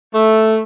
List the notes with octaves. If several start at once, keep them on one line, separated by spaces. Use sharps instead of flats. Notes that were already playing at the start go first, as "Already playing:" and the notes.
A3